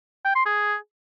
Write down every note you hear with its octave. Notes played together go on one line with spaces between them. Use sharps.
G5
C6
G#4